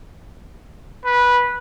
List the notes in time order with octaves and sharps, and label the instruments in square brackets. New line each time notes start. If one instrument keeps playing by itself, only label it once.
[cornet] B4